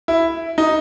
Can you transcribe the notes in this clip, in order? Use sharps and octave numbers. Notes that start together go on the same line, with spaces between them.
E4
D#4